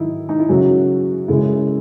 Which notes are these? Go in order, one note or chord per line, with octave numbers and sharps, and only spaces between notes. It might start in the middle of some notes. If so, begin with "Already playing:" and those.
Already playing: G#2 D#3 F#3 D#4 E4
D#4
E4
F#2 C#3 F#3 F#4
F#2 C#3 G#3 E4